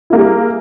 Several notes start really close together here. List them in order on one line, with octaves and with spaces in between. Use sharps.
E4 A#3 G3 G#4